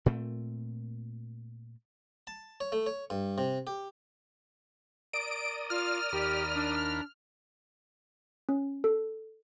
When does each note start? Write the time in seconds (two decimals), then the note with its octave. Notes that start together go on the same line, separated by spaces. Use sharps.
0.06 A#2 A3 C4
2.27 A5
2.61 C#5
2.72 A3
2.86 C#5
3.10 G2
3.38 C3
3.67 G4
5.13 A#4 D5 D#6 D7
5.70 F4 F6
6.12 D#2 G4 A#4 B5
6.55 D4
8.49 C#4
8.84 A4